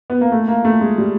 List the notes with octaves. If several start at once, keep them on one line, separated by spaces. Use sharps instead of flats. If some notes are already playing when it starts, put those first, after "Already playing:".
B3
A#3
A3
A#3
A3
G#3
G3